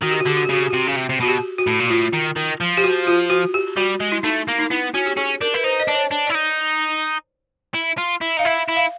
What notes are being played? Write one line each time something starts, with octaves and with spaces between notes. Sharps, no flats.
D#3 F#4
G4
F#4
D3 G4
F#4
G4
C#3 F#4
G4
C3 F#4
C#3
C3
C3
B2 F#4
G4
F#4
A2
A#2
A2 F4
D#3
D#3
F3
G4
F#4
F4
F#4
G4
G3 F#4
G#3
E4
A3 D#4
A#3
D#4
B3 E4
C#4 F#4
G4
C#4 G#4
D4 A#4
E4 B4
D#4 C5
D#5
D4 D5
C#5
D4
E4 D5
D#4
E4
F4
E4
D#4 F5
E4 E5
E4
F5